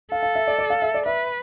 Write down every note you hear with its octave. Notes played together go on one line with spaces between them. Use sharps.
A4 F5
F5
E5
D5
D5
F5
E5
D5
B4 E5